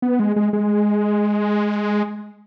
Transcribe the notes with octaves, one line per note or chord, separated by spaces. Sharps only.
B3
G#3
G#3
G#3